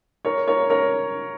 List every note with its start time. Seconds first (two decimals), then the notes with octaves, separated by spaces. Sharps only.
0.25 A#4 C#5
0.47 A#4 C#5
0.70 A#4 C#5